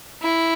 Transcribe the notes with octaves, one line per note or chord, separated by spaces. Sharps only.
E4